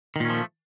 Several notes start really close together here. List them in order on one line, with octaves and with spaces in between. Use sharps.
D#3 A#2 C#4 F3 A3